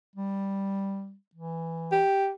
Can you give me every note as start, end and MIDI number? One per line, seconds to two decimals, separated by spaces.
0.16 1.15 55
1.35 2.01 52
1.92 2.31 67